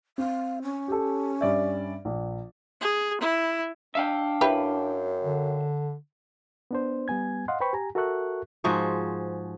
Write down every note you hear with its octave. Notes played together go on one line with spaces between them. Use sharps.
C4 F5
C#4
G4 A4
G2 D5 E5
A#1
G#4
E4
D4 E5 F5 G5
F#2 E4 G4 B4
D3
B3 D4 C5
G3 B3 G#5 G#6
D#5 F5 F#5 C6
B4 C5 G5 B5 C#6
G4 G#5 A#5
F#4 A4 A#4 E5 C#6 F#6
G#2 F3 F#4 G#4